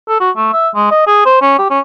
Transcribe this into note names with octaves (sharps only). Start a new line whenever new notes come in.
A4
F#4
A3
E5
G#3
D#5
G#4
C5
C#4
G4
C#4